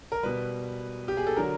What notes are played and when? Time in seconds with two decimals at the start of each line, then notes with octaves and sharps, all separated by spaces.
0.12 A#4
0.23 B2 G3 B4
1.08 G4
1.17 G#4
1.27 A4
1.36 D3 F#3 A#4